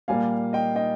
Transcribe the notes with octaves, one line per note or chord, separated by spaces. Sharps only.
A#2 G3 A#3 F5 G#5
D#5 G5
D#5 G5